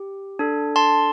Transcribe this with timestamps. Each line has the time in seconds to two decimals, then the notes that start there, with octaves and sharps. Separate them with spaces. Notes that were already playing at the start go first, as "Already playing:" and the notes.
Already playing: G4
0.39 D4 A4
0.76 A5 C6